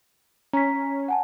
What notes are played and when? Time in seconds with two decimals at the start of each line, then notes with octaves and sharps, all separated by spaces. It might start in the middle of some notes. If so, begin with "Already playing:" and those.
0.53 C#4 A#5 B6
1.08 F#5 G#5 A5